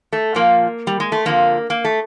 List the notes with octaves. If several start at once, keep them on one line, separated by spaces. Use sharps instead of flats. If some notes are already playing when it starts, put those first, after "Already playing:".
A3
A#2 F3 A#3
G3
G#3
A3
F2 D3 F3 A#3
A#3
A3